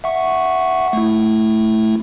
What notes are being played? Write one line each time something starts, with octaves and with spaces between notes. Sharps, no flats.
E5 F#5 C#6
A3 E4